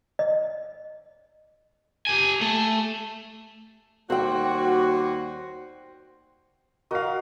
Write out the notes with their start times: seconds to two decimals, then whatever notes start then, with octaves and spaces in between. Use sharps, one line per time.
0.19 D#5
2.07 G4 G#5
2.41 A3
4.10 D#2 G3 F#4 C5 G5
6.91 F#4 A#4 D#5 F5